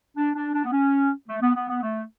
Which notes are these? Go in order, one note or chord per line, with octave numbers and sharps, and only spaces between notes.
D4
D4
D4
B3
C#4
A3
B3
B3
B3
A3